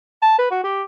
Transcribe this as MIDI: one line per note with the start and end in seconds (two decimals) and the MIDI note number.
0.22 0.37 81
0.39 0.50 71
0.51 0.63 66
0.64 0.83 67